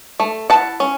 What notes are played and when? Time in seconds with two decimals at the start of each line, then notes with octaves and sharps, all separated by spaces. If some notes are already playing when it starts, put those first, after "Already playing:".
0.20 A3
0.50 E4 F#5 A5
0.80 C#4